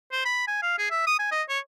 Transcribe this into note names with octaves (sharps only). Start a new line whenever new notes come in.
C5
B5
G#5
F5
G#4
E5
D#6
G#5
D#5
C#5